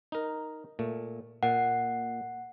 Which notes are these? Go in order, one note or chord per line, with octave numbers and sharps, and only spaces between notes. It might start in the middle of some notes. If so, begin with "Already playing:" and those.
D#4 A#4
A#2 A3
A#2 F#5